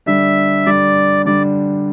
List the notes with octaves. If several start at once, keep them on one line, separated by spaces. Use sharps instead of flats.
D3 G3 D4 E5
D3 G3 D4 D5
D3 G3 D4 D5